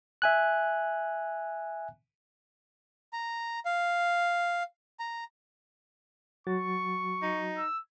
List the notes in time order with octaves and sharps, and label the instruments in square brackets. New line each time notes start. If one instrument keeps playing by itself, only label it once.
[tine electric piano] E5 G#5 F#6
[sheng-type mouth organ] A#5
F5
A#5
[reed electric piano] F#3 F#4 A6 [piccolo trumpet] C#6
[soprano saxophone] D#4
[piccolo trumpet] E6